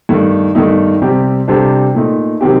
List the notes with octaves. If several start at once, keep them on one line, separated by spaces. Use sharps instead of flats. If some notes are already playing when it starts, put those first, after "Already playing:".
G2 D#3 A3
G2 D#3 A3 D#4
C3 G3 C4 G4
C3 G3 D4 A4 C5
A#2 A3 D#4
C3 D#3 F#3 C4 G4